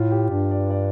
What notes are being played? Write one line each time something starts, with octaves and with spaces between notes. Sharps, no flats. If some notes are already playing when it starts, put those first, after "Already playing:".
Already playing: A2 F4
G4
G2 D4
D5
D5